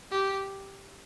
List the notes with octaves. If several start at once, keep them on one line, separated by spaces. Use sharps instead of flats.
G4